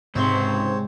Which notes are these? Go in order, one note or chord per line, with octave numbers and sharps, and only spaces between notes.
C#2 G#2 C3 C4 C5 C#5 C6